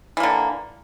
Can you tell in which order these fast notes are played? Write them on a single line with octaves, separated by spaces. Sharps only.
E3 A#3 D3